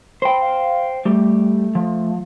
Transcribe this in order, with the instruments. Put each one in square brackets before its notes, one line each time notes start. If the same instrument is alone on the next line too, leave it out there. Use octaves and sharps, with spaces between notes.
[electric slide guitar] C5 G5 [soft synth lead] B5
[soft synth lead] F5
[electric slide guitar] G3 G4 [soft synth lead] A3
[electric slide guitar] F3